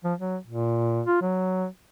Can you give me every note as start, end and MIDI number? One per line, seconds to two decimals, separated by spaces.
0.05 0.14 53
0.19 0.37 54
0.47 1.01 46
1.06 1.19 65
1.22 1.67 54